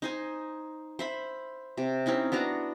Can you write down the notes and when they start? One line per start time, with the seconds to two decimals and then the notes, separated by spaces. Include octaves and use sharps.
0.02 D#4 C5 G#5
0.99 C5 E5 B5
1.77 C3
2.06 C4 C#4 D#4 E4
2.32 B3 D4 F#4 A#5